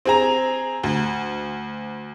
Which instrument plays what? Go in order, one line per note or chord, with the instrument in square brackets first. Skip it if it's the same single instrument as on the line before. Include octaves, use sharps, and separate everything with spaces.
[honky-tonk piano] C4 G#4 A#5
D2